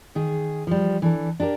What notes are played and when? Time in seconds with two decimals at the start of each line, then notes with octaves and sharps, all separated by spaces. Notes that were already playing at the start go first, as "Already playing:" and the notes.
0.15 D#3 G#4
0.67 F3 G3
1.02 E3 D4 A4
1.40 D4 G4 G#4 A#4